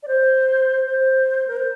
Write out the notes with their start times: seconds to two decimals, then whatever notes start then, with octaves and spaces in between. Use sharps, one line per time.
0.03 D5
0.08 C5
0.87 C5
1.48 A#4
1.57 C5